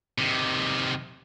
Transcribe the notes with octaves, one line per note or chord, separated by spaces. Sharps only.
C3 D#3